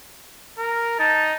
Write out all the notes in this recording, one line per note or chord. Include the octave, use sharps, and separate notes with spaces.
A#4
D#4 A5